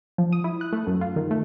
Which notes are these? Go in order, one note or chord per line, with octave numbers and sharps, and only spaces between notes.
F3
D#6
E4
F#6
A3
F#2
F4
D#3
A3